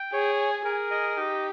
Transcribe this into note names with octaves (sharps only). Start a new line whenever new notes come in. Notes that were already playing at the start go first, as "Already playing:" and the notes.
Already playing: G5
G#4 C#5
G#5
G#4 A#4
D#5
D#4 G4